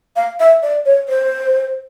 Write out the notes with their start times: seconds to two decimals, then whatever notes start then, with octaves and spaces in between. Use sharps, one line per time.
0.16 F5
0.40 E5
0.63 D5
0.86 C#5
1.09 C5